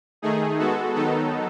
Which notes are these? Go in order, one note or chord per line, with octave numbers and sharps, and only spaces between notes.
D#3 A3 D#4 G#4
G#3 B3 F#4 A4
D#3 F#3 B3 D#4 A4